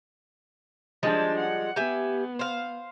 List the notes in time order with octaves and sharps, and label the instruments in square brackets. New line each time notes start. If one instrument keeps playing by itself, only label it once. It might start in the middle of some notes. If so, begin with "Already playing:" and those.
[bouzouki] F3 G3 G#3 [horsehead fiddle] D4 A5
[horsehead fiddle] F#5
[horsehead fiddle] B3 [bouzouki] G4 E5 G#5
[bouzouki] C5 F5